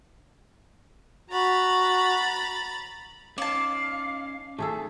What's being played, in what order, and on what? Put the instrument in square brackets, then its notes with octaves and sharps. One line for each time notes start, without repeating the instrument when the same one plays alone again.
[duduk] F#4 [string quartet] A#5 B5 A6
[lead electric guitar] C#4 D#4 [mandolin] D5 A5 [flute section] F5
[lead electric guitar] D#3 [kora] A3 G#4 A4